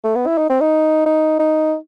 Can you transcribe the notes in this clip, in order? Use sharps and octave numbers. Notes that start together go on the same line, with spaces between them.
A3
B3
E4
D#4
C4
D#4
D#4
D#4